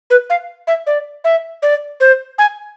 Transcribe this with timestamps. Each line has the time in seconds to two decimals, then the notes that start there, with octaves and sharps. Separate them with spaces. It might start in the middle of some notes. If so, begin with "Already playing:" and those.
0.10 B4
0.30 F5
0.67 E5
0.87 D5
1.24 E5
1.62 D5
2.00 C5
2.38 G#5